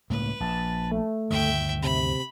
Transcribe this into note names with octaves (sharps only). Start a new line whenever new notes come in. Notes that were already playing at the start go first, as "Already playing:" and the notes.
C#2 A2 A#3 B4
A#1 A5
A3
D2 G2 D#3 E5 G5
C3 B5